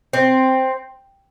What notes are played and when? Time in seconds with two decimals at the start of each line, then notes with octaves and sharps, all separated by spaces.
0.13 C4